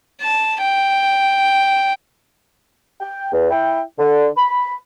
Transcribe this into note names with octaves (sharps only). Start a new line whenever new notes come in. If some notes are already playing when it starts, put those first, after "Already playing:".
A5
G5
G5
E2
E4 G5
D3
B5